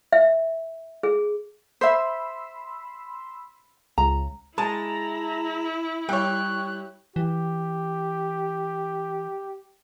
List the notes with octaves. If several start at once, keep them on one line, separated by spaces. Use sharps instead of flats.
E5
G#4
C5 E5 B5 C6 E6
C#2 A#5
G#3 E4 A5 A#5
G3 C#5 G5 F#6
E3 G4